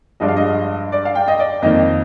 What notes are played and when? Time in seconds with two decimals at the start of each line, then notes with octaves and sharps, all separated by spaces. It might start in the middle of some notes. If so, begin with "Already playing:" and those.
0.20 G2 F3 G#3 D4 D#5
0.28 F5
0.37 D#5
0.92 D5
1.05 F5
1.15 G5
1.28 D#5
1.39 D5
1.62 F2 D#3 A#3 D#4 D#5